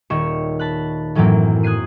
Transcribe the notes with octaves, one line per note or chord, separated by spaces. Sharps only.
D#1 D#3 C#5 C#6 E7
A5 B5 F#6
F#2 A2 E3 F#3 A#3 C4
D#6 F#6 G#6 C7 D#7